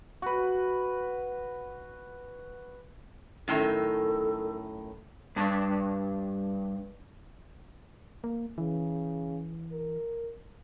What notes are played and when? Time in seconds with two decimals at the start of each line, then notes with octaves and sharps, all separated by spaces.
0.22 F#4 B4
3.48 F#2 A2 D#3 A4
5.36 G2 A5
8.24 A#3
8.58 C#3 E3
9.72 A#4